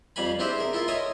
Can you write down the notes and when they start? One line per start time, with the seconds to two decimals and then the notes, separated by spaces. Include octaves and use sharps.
0.16 F2 G3 F5 G#5 B5
0.39 C4 D4 E4 G4 G#4 C5
0.58 G#4 A#4
0.73 E4 F4 A4 A#4
0.88 C#5 D#5 E5 G#5 C6 D#6